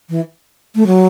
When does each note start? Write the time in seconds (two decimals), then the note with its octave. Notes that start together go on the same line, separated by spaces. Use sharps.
0.10 E3
0.75 A3
0.86 F#3